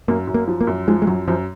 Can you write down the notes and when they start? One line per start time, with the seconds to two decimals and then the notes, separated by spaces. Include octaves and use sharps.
0.08 F#2 A#3
0.27 F#2
0.34 A#3
0.48 F3
0.61 A#3
0.67 F#2
0.88 F3 G#3
1.02 G#3
1.07 F#2 F#3
1.28 F#2 F3